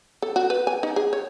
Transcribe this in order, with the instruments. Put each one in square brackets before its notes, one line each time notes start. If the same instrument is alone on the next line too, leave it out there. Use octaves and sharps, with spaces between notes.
[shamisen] A4
F#4
B4
G#5
D#4
G#4
C#5